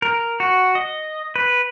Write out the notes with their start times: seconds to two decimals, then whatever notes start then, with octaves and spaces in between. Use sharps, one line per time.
0.02 A#4
0.40 F#4
0.75 D#5
1.36 B4